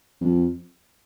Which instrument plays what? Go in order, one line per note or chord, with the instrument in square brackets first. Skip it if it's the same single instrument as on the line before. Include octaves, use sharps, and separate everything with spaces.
[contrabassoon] F2